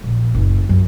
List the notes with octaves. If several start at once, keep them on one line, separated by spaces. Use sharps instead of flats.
A#1
F#1
F#2